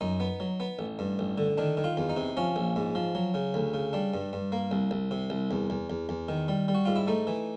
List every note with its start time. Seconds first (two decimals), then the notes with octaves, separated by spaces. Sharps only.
0.01 F#2 D#4
0.20 B3
0.40 F#3
0.60 B3
0.79 A1
0.99 G2
1.19 A1
1.38 D3
1.58 D#3 D4
1.77 D#3
1.84 F4
1.97 E2
2.10 D#4
2.16 C3
2.37 F3 C#4
2.56 A#1
2.76 G#2
2.95 F3
3.15 F#3
3.34 C#3
3.54 D2
3.74 C#3
3.93 G3 D4
4.14 G2
4.33 G2
4.52 A#3
4.71 C2
4.91 C2
5.11 C3
5.30 C2
5.51 E2
5.70 E2
5.90 E2
6.09 E2
6.29 D#3
6.48 G3
6.68 G3
6.74 F#4
6.85 G#2 F4
6.96 E4
7.07 A3 D#4
7.27 E3